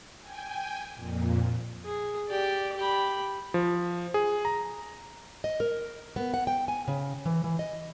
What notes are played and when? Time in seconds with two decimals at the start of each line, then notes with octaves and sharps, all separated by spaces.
0.20 G5 G#5
0.95 F2 A#2
1.85 G#4
2.28 G4 D5
2.76 G4 B5
3.54 F3
4.14 G#4
4.45 A#5
5.44 D#5
5.60 A#4
6.16 B3
6.34 F#5
6.47 G5
6.68 G#5
6.88 C#3
7.25 E3
7.44 E3
7.59 D#5